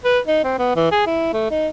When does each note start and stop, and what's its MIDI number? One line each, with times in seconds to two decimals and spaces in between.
0.05 0.19 71
0.27 0.43 63
0.44 0.59 60
0.59 0.71 59
0.76 0.90 52
0.92 1.06 68
1.07 1.33 64
1.33 1.46 57
1.50 1.68 63